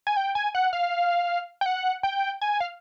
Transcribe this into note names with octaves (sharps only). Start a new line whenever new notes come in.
G#5
G5
G#5
F#5
F5
G5
F#5
G5
G#5
F5